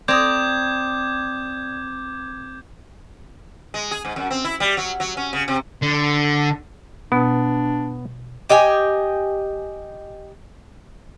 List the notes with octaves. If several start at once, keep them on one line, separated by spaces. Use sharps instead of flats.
C4 D5 A#5 D6 D#6 G6 G#6
G#3
G#4
G#2
F#2
C4
E4
G3
F#3
F#3
C#4
C#3
C3
D3
B2 B3 D4
G4 D#5 G5 G#5